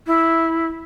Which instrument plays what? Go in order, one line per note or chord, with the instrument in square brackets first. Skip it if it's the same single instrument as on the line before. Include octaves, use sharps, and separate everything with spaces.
[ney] E4